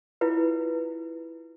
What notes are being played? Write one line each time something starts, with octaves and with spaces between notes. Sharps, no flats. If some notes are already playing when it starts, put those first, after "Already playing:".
E4 F4 B4